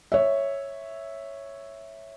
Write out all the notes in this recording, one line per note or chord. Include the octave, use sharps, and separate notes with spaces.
C#5 E5